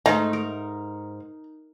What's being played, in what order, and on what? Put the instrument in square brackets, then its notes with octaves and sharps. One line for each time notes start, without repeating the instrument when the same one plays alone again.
[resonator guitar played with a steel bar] G#2 [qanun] A3 D#4 [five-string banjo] A#5
[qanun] A#4